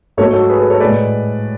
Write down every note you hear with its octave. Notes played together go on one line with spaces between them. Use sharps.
G#2 F#3 A3 A4 C#5
F#4 A4
G#4 B4
G#4 B4
A4 C#5
A2 G#3 B4 D5